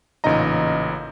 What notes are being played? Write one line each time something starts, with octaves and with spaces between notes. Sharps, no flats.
A1 A#2 C#3 D#4 D#5 A#5